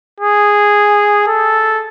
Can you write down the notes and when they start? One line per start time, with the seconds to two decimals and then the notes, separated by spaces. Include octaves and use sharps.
0.20 G#4
1.27 A4